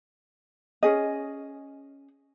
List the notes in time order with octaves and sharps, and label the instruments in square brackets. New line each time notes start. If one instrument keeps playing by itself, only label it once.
[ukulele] C#4 G#4 D#5